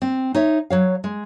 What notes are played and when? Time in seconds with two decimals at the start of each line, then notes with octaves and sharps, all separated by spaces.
0.02 C4
0.35 D#4 C#5 E5
0.70 F#3 C#5 F5
1.04 G#3